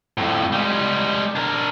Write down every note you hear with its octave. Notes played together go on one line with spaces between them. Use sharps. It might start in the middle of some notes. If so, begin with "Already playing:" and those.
F2 A2
G3 G#3
D4 A#4